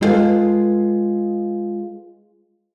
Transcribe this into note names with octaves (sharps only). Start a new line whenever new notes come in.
G#3 E4 F4 A4 B4 F5